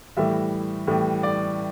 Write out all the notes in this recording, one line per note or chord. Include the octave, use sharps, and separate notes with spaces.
A2 E3 G3 E5
A2 E3 G3
D5